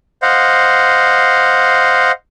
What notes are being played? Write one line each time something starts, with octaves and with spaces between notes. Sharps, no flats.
C5 D#5 F5 F#5